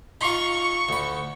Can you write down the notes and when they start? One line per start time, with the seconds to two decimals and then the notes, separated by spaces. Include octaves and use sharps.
0.21 D#4 F4 C#6
0.89 D2 B5